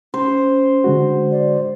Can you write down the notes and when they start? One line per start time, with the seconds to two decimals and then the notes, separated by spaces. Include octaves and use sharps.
0.14 C#4 C5
0.84 D3 G#3 F#4
1.31 D5